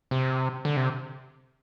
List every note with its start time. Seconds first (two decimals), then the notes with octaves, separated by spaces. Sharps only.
0.11 C3
0.65 D3
0.77 C3